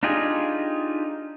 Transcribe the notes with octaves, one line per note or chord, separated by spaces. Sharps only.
D4 D#4 F4 G4 G#4